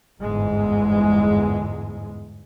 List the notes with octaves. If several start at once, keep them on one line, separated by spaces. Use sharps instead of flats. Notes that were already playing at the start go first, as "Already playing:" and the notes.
G1 E2 G#2 G#3